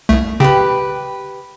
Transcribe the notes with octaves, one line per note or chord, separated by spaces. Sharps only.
C2 A3
C#3 G4 B4